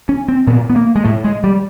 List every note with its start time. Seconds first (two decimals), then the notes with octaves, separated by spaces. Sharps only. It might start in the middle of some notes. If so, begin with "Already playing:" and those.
0.09 C#4
0.28 C4
0.47 A#2 B3
0.70 B3
0.76 A#3
0.96 G#3
1.05 A2 A3
1.24 G#3
1.44 G3